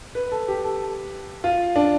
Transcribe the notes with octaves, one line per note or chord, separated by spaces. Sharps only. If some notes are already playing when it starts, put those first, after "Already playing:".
B4
A4
G4
A4
F4
D4